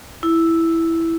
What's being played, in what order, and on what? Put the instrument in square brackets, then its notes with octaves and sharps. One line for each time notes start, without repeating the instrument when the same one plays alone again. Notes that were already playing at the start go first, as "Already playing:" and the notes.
[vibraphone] E4